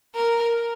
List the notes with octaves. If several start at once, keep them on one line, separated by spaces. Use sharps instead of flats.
A#4